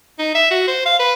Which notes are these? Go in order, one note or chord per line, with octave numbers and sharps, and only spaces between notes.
D#4
E5
F#4
C5
F5
B4